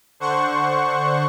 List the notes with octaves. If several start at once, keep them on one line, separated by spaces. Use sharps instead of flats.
D3 C5 F#5 C#6